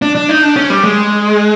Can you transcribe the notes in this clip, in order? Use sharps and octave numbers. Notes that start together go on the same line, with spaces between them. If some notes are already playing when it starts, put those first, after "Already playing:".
D4
D4
D#4
D4
C#4
G3
G#3